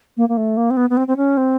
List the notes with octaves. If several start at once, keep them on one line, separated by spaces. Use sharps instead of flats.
A#3
A#3
A3
A#3
C4
B3
B3
C4
C4
C#4
C4